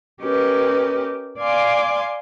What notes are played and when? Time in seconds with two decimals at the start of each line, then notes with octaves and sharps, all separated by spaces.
0.21 C#4 G4 A#4 B4 D#5
1.39 D5 F5 G#5 C6 D6